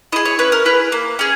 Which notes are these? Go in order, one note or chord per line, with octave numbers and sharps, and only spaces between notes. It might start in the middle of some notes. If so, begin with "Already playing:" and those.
E4 G#4 D#5
C#5
C#4 B4
A#4
E4 G#4 B4
A#3
C#4 G#4